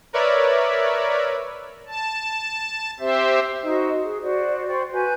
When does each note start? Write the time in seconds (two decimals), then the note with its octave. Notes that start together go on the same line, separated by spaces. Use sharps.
0.13 A#4 B4 C#5 D5 E5 B5
1.87 A5
3.00 C4 G4 C5 E5
3.62 D#4 F#4 C5 D#5
4.01 G#4
4.21 F#4 C5 D5
4.67 C5 D5 G5 C#6
4.91 F#4 B4 G#5 G6